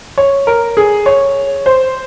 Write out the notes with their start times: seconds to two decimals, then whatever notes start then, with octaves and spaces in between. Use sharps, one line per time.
0.18 C#5
0.47 A#4
0.77 G#4
1.06 C#5
1.66 C5